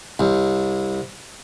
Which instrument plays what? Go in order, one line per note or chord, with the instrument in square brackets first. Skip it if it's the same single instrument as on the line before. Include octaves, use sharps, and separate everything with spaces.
[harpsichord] C2